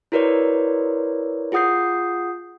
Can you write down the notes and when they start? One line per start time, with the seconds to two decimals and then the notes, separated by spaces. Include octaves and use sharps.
0.12 E4 F#4 A#4 B4 C#5 D5
1.52 F4 G#4 F#5 D#6 G6 C7